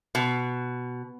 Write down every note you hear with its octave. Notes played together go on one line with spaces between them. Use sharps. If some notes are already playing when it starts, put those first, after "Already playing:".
B2